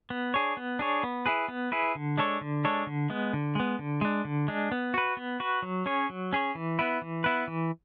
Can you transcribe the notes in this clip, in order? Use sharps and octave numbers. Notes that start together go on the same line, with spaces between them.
B3
D4 G#4 C#5
B3
D4 G#4 C#5
B3
E4 G#4 B4
B3
E4 G#4 B4
D3
G#3 D4 A4 C#5
D3
G#3 D4 A4 C#5
D3
G#3 B3
D3
G#3 B3
D3
G#3 D4
D3
G#3 D4
B3
F#4 B4
B3
F#4 B4
F#3
C#4 G#4 C#5
F#3
C#4 G#4 C#5
E3
B3 E4 B4
E3
B3 E4 B4
E3